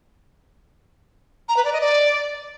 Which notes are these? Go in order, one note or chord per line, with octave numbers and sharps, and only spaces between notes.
A#5
B4
D5
D#5
D5